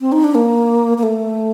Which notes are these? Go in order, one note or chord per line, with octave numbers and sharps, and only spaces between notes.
C4
D#4
D4
A#3
A#3
A3